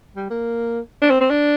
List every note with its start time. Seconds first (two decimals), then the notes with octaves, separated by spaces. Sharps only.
0.16 G3
0.30 A#3
1.02 D4
1.10 C4
1.21 C4
1.30 D4